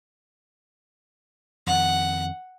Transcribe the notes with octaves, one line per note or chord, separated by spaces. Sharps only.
F2 D#3 F#5